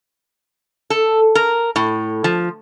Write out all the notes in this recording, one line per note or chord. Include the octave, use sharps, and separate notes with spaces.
A4
A#4
A2
F3